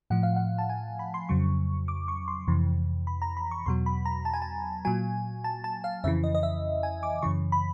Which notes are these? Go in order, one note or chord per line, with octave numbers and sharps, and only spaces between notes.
A2 F3 F#5
F5
F#5
A5
G#5
B5
C6
F2 C#3 F#3 C#6
D6
C#6
C6
F2 C3 E3
B5
A#5
B5
C#6
E2 B2 F#3 C6
B5
A#5
A5
G#5
A5
A#2 F#3 G#5
A5
A5
F5
F2 C#3 E3 E5
D#5
D#5
E5
G#5
D6
F#2 C#3 E3 C#6
B5